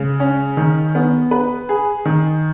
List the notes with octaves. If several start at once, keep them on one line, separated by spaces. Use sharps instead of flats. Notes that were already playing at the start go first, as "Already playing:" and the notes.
Already playing: C#3 G#3
C#4
D#3
B3
B4
G#4
D#3